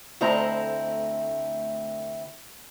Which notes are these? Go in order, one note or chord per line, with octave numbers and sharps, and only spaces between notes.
D2 A3 C4 E4 D#5 A#5